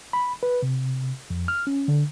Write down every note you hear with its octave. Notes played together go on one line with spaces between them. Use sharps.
B5
B4
C3
F2
F6
C#4
D3